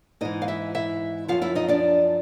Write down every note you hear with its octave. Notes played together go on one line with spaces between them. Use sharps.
G#2 E3 D#4 D#5
F5
E4 E5
E4 E5
F#2 C#3 F3 F4 F5
E4 E5
D#4 D#5
D4 D5